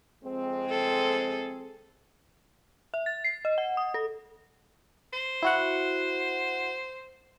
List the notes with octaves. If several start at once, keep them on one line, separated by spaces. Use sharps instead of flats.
F2 G#3 C4
G#4 A4
E5
A6
C7
D#5
F#5
D#6
A4
C5
E4 F#4 F#5